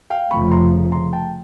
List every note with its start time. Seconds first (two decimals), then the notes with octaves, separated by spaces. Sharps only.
0.10 F5 G5
0.31 F1 F2 C#3 F3 A3 B5 C#6
0.51 A#5 C6
0.92 A#5 C6
1.13 G5 A5